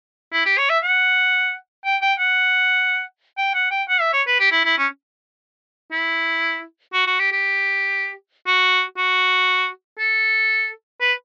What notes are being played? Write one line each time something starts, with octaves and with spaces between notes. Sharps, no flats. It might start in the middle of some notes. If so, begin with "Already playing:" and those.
E4
G4
C#5
E5
F#5
G5
G5
F#5
G5
F#5
G5
F#5
E5
C#5
B4
G4
E4
E4
C#4
E4
F#4
F#4
G4
G4
F#4
F#4
A4
B4